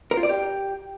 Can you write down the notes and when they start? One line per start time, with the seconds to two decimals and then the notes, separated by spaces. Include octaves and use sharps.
0.11 A#4
0.17 F4
0.23 D5
0.29 G4